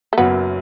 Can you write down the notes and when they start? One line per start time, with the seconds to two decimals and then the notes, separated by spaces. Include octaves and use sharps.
0.13 A3
0.17 F#1 F#2 F#3 B3